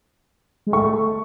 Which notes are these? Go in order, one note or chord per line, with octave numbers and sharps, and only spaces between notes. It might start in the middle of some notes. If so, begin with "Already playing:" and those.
G#3
A3 C#6